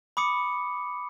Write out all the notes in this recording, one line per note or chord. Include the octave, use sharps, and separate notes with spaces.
B5 D6 D#6 C#7